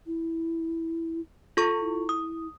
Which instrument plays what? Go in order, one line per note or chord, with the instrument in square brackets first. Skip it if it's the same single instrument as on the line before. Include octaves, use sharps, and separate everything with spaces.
[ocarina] E4
[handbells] F4 A4 C#6
[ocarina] E4
[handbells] D#6